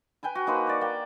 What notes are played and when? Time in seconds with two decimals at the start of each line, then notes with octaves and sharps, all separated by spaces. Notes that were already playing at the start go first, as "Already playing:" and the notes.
0.23 B4 G5 G#5 B5
0.35 F#4
0.47 A#3 D#4 B4 C5
0.67 C#5 D5
0.81 A#3 G5